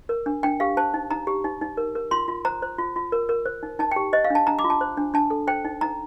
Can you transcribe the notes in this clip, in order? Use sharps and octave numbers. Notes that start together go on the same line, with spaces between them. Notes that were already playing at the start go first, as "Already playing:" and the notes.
A#4
D4
D4 G5
G4 F5
C5 A5
D#4
D#4 A#5
G4
D#4
D#4
A#4
A#4
F4 C6
F4
C5 A#5
C5
F4
F4
A#4
A#4
C5
D#4
D#4 A5
G5
G4
C5 D#5
F5
D4 A5
D4 A#5
D6
F4
A5
C5
D4
D4 A5
A4
C5 G5
D#4
D#4 A#5